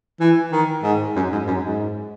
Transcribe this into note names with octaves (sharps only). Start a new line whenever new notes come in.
E3
D#3
G#2
F#2
G#2
F#2
G#2